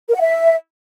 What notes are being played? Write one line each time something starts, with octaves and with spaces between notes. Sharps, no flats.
A#4
F#5
E5